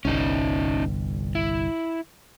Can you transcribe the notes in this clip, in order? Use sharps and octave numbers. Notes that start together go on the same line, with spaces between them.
G1 C2 C#4 D#4
E4